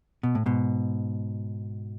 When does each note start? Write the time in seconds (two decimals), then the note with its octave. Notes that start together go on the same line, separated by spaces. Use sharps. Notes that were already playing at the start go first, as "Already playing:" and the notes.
0.23 B2
0.35 A2
0.46 G#2 B2